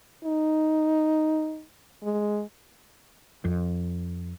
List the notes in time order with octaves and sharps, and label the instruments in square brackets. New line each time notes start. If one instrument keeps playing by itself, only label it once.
[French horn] D#4
G#3
[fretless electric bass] F2